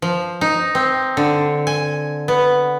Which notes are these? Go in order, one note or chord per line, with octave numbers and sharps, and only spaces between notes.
F3
D#4
C4
D3
G#5
B3